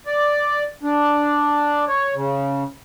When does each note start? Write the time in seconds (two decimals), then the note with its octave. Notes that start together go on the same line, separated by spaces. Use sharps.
0.07 D5
0.83 D4
1.89 C#5
2.15 C#3